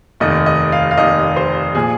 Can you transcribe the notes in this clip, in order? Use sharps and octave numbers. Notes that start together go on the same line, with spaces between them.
F1 D#2 D#3 D#5
D#5
F5
F5
F1 D#2 D#3 D#5
C5
A#2 F3 G#4